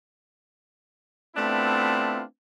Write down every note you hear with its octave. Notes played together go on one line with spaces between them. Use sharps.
A3 B3 C4 D4 E4 F4